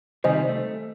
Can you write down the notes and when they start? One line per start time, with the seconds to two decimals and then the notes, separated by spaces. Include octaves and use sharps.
0.24 C3 D#3 G3 C5 D#5 G#5
0.49 A3